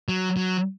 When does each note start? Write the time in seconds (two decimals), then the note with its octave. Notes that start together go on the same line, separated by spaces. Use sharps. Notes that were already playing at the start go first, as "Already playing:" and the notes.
0.08 F#3
0.37 F#3